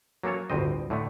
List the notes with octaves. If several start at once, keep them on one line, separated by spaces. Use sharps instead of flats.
F#3 A#3 C#4 A4 C#5
G1 D2 A2 C4 D#5
A2 D3 A3